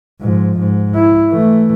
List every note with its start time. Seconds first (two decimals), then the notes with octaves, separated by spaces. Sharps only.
0.21 G#2 F3
0.59 G#2
0.95 E4
1.30 E3 A3